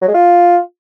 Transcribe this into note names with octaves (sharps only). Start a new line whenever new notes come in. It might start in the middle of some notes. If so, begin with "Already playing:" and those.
F#3
G#3
F4